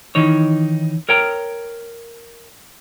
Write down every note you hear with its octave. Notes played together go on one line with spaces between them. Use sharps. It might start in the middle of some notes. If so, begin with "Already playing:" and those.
D#3 E3 D#4 C#5
A#4 C#5 G5 A#5